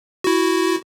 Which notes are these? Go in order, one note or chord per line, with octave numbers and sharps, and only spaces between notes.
E4 F#4